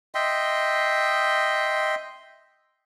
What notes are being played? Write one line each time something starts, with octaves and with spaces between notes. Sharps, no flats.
D#5 E5 G5 C6